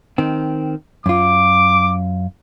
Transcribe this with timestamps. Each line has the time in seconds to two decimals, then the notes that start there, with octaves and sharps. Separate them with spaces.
0.18 D#3 C4
1.06 F#2 F4 D6